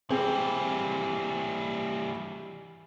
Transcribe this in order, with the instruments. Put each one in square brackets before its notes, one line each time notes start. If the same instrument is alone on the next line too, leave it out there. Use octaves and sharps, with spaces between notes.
[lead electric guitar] E3 G3 [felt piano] C4 G#4